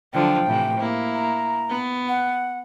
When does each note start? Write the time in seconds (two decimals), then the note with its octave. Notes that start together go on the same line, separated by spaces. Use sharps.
0.13 D3 F3 F#3 G5
0.46 A2 C3 E3
0.78 A#3 E4
1.15 A#5
1.69 B3
2.09 F#5